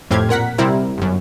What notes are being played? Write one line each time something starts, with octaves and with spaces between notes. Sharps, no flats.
F2 A2 C4 G4 F6 G#6
A#2 A#4 F#5 B6
C3 G3 C4 E4 A#4
G1 F#2